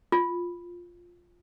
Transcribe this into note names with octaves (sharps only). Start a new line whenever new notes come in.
F4